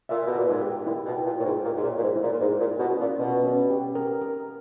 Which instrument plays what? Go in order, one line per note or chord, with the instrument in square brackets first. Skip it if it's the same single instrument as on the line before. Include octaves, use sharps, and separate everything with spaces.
[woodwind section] A#2 [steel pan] E5
[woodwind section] B2
[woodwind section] A#2 [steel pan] A#4
[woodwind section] G#2
[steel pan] G4
[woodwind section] A#2 [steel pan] E4
[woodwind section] B2
[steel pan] G5
[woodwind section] A#2
[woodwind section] A#2 [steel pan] C#5
[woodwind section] G#2
[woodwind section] A#2 [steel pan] G4
[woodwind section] G#2
A#2
[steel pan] C#5
[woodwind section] A#2
G#2
[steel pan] E4
[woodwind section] A#2
A#2
[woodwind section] G#2 [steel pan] G4
[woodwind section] A#2
[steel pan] E4
[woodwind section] B2
[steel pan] C#4
[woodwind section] A#2
[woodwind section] B2 [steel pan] C#4
[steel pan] C#4
G4
A#4
A#4